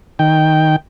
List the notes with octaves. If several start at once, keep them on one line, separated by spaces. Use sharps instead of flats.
D#3 G5